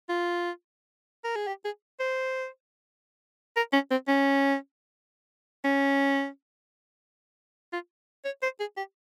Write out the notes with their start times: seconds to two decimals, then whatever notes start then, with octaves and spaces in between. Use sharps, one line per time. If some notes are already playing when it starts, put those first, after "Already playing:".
0.09 F4
1.24 A#4
1.36 G#4
1.48 G4
1.65 G#4
2.00 C5
3.57 A#4
3.73 C#4
3.91 C4
4.08 C#4
5.65 C#4
7.73 F4
8.25 C#5
8.43 C5
8.60 G#4
8.77 G4